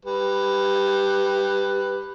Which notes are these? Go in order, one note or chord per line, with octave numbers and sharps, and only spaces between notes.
G3 B4